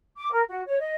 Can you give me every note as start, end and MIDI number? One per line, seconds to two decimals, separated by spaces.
0.18 0.31 86
0.31 0.42 70
0.47 0.62 66
0.66 0.76 73
0.79 0.94 75